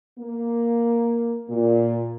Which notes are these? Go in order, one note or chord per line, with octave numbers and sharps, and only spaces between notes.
A#3
A#2